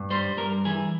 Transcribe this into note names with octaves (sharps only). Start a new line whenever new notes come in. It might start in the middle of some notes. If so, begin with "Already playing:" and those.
Already playing: G2
G3 C5
G2 A#4
E3 G#4